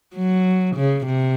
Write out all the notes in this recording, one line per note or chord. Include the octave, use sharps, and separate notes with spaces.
F#3
C#3
C3